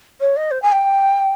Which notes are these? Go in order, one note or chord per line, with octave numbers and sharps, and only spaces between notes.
C#5
D#5
C5
G#5
G5